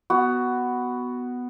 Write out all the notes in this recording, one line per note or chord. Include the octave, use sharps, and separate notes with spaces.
B3 F#4